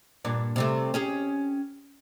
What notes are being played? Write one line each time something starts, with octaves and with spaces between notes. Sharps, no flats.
G2 A#2 D4
C3 G3 A3
C#4 G4 G#4